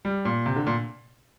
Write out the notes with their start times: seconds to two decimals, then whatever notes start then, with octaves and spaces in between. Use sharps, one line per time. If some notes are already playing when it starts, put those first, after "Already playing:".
0.05 G3
0.25 A#2
0.46 C3
0.56 D3
0.67 A#2